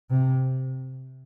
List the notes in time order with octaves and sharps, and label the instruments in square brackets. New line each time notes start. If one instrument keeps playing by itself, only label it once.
[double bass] C3